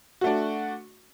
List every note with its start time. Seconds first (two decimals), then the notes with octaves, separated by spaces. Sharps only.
0.21 F#4
0.24 A3
0.27 D4